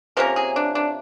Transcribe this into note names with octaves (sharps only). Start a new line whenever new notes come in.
C3 F3 A#3 C#4 A#4
G#4
D4
D4